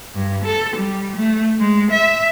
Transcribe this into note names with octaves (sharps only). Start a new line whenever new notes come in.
G2
A4
G3
A3
G#3
E5